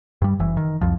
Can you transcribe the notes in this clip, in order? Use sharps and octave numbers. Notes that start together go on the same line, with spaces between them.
G2 G3
F#1 E3
D#3
C2 F2 F3